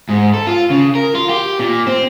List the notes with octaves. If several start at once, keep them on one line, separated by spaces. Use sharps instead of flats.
G#2
A4
F4
C#3
A#4
F4
G4
A#2
C4